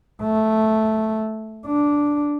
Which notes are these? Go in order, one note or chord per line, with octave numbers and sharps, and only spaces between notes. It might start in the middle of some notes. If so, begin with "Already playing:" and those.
A3
D4